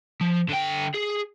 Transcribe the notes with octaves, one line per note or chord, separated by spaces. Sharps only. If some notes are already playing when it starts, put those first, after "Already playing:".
F3
D3 G5
G#4